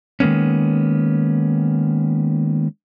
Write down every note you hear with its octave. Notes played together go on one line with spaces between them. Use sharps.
D#3 G#3 A#3 B3 C#4